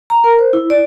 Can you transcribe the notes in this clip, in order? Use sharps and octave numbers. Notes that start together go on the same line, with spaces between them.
A#5
A#4
C5
E4
D5